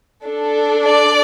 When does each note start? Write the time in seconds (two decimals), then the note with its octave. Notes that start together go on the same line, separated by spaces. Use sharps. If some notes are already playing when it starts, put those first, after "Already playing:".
0.24 D4 A4
0.84 D5